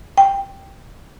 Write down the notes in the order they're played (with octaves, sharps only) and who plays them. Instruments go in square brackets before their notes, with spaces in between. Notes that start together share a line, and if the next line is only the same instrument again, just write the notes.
[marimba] G5